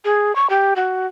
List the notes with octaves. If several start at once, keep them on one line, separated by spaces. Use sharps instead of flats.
G#4
C#6
G4
F#4